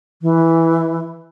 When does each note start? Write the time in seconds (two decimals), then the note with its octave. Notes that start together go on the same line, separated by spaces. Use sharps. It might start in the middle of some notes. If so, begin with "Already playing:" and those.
0.22 E3